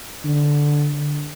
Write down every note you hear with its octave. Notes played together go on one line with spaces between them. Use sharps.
D3